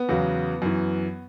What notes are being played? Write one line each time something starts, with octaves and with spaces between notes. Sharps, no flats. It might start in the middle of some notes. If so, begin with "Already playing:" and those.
Already playing: B3
E2 C#3 F#3
F#2 E3